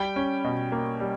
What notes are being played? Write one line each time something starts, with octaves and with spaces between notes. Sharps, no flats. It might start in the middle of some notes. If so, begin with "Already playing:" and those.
Already playing: G3 G5 B5
C#4
B2
A#3
G3